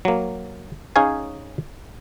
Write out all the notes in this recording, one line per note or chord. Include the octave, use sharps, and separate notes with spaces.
F#3 A#3
C#4 D#4 G#4 C#5 F5 G#5